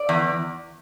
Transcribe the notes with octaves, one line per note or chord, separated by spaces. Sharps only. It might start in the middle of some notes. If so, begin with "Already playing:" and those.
Already playing: D5
E2